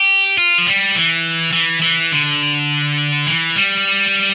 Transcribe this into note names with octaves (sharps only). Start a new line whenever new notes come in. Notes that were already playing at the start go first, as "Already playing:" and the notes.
Already playing: G4
F4
F3
G3
E3
E3
E3
D3
E3
G3